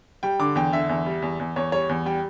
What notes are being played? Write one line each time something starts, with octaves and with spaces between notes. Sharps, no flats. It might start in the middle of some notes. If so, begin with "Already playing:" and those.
G3 G5
D3 D6
E2 G5
D3 E5
E2
G3
E2
E2
E2 C#5
G3 C#5
E2
G3 G5